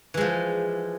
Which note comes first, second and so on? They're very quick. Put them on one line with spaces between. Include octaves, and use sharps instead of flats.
E3 G#3 F3